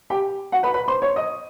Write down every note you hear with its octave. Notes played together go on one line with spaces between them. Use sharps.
G4 G5
F#4 F#5
B4 B5
B4 B5
C5 C6
C#5 C#6
D#5 D#6